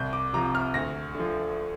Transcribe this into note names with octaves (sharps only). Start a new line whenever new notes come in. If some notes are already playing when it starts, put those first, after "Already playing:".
Already playing: C2 G6
D6
C3 F3 A#5
F6
D2 A#6
D3 F3